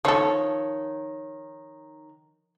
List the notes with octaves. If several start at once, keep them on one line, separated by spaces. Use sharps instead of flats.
D#3 F3 A4 C#5